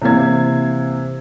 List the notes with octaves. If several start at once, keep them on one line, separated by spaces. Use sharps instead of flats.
C3 E3 A#3 C5 G#6